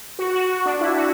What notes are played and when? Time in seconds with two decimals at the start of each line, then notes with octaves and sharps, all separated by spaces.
0.19 F#4
0.34 F#4
0.66 D4
0.81 E4
0.96 F#4